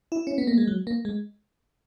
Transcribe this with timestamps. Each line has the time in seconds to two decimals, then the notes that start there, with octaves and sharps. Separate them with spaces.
0.12 E4
0.27 C#4
0.38 B3
0.47 A#3
0.58 G#3
0.67 F#3
0.87 A#3
1.05 G#3